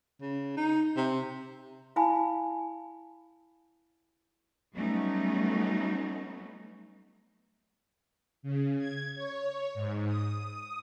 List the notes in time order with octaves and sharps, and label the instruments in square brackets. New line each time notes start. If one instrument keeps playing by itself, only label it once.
[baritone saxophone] C#3
D#4
C3
[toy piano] E4 F5 G#5 A5 B5
[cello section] F#3 G3 A3 B3 C#4 D#4
[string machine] C#3
G#6
C#5
G#2
D#6